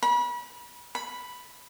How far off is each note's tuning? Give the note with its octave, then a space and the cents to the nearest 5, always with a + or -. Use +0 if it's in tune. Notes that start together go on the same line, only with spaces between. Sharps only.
B5 -35
B5 +0